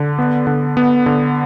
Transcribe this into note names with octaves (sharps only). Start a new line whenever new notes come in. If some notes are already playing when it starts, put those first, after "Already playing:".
Already playing: D3
B3
D3
B3
D3